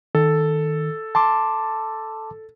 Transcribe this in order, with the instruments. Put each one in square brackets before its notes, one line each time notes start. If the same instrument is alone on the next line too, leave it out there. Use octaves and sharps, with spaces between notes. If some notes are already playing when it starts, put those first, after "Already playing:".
[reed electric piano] D#3 [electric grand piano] A4
[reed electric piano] A5 C6 D6